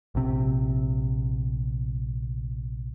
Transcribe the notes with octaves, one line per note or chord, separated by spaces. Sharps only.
A#1 C3